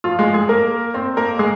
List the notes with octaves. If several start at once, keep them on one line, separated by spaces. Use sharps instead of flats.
F3 F4
G#3 G#4
G#3 G#4
A#3 A#4
C4 C5
A#3 A#4
G#3 G#4